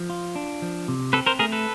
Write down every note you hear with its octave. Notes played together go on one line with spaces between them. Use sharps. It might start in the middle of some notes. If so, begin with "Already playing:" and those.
Already playing: F3
F4
D4
F3
C3
C4 A4 B4
A#4 C5
A3 G#4 A#4
A4 B4